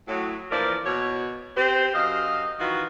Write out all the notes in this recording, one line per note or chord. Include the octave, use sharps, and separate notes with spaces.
A2 F#3
A#2 E3 F3 A#4 D5
B2 C#5
C4 G4 C5
F#2 D#5 F5
D#3 E3 F4 F#4